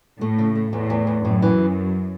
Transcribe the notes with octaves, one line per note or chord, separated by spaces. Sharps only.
A2 A3
C#3
A3
E2 A2
E2
E2
F#2 A2
E3